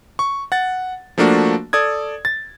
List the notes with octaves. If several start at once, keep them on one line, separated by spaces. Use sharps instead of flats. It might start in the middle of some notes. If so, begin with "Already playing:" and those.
C#6
F#5 A6
F3 A3 A#3 D4 F#4
A4 D5 D#6 G#6
A6